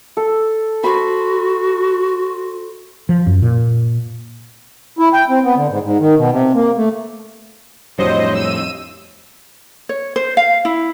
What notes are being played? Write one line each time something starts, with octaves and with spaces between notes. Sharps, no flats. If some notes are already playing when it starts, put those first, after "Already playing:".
A4
F#4 C5 B5
F3
F#2
A#2
E4
G5
C4
B3
D3
G#2
G#2
D#3
B2
C3
A#3
A3
F2 A2 F#3 G3 D4 C5 D#5
E6 D#7
C#5
C5
F5
E4